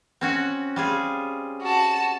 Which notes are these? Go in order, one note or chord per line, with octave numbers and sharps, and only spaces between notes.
C4 C#4 F#4
G3 F4 G#4
F#4 A5